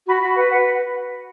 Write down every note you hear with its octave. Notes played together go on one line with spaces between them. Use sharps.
F#4 B5
F#4 B5
B4 F#5
B4 F#5